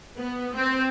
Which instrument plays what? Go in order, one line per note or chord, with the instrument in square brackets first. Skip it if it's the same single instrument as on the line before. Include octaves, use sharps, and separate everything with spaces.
[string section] B3
C4